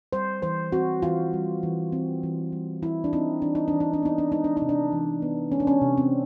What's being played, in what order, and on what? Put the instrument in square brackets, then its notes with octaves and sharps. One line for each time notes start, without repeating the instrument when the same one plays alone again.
[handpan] G3 C5
E3 C5
C4 F#4
E3 F4
G3
E3
C4
E3
G3
E3 E4
D4
C4 D#4
E3 D4
D#4
E3 D4
D#4
D4
B3 D#4
D4
G#3 D#4
D4
C3 D#4
D4
E3
B3
G#3 C#4
D4
C#4
C3
C4